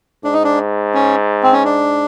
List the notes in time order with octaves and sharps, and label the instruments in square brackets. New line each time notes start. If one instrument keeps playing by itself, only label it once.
[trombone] G#2 [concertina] D4
[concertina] D#4
D4
C#4
C4
C#4
D4